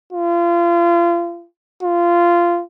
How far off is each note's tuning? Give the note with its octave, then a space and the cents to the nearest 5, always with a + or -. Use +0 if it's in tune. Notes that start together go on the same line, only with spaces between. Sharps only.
F4 -30
F4 -15